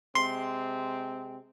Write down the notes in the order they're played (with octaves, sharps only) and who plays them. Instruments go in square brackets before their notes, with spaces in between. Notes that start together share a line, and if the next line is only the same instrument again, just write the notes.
[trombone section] C3 G#3 C4 [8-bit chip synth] C6